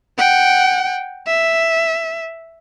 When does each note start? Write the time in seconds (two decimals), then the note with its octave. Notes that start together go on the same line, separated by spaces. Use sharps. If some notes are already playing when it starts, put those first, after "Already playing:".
0.18 F#5 G5
1.27 E5